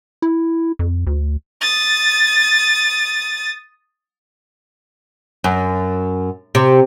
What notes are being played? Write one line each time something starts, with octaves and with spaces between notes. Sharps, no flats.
E4
F2
D2
D#6 A6
F#2
C3